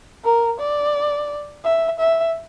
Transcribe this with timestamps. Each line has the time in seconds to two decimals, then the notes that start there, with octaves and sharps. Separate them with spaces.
0.25 A#4
0.60 D5
1.65 E5
2.00 E5